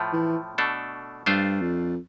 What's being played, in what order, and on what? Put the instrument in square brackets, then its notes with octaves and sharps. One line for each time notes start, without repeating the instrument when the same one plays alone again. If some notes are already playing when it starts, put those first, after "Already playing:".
Already playing: [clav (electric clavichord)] A2 F3 A3
[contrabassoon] E3
[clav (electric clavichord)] B2 A3 D4 A4
[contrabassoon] G2 [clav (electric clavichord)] A3 D4 F4 C5
[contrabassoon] F2